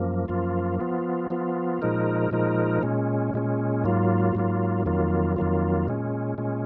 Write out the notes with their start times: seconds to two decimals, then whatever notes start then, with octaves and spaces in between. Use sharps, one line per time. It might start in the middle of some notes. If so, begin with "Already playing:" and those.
Already playing: F#2 F3 A#3
0.28 F#2 F3 A#3 F4
0.80 F3 B3 F4
1.30 F3 B3 F4
1.82 A#2 F3 G#3 D#4 A#4
2.31 A#2 F3 G#3 D#4 A#4
2.83 A#2 G#3 C#4
3.34 A#2 G#3 C#4
3.84 G#2 F#3 A#3 F4
4.35 G#2 F#3 A#3 F4
4.86 F2 D#3 F#3 A#3 F4
5.36 F2 D#3 F#3 A#3 F4
5.88 A#2 G#3 C#4
6.38 A#2 G#3 C#4